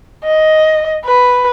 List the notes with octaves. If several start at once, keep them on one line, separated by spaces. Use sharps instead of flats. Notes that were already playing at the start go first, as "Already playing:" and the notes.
D#5
B4